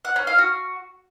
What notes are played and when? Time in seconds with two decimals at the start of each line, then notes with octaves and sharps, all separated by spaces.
0.05 F#5
0.16 C#4
0.27 F5
0.38 F#4